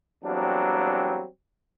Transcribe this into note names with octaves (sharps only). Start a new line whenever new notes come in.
E2 F#3 G3 A#3 C4 D4